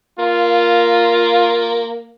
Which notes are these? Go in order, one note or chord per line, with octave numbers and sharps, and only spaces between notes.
A#3 F4